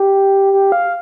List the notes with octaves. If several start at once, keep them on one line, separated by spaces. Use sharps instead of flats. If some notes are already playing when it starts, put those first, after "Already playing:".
Already playing: G4
G4
F5